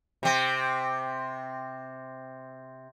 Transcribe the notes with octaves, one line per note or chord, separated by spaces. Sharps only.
C3 C4